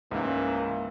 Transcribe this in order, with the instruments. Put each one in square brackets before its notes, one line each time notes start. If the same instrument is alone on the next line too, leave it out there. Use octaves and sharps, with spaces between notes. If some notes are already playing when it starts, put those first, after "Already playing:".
[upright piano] C#2 [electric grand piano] G#2 C#3 [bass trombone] E3 [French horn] A#3